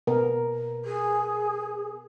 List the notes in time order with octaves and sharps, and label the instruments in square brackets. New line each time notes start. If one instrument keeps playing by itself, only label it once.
[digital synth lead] B2 [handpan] A#4
[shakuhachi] G#4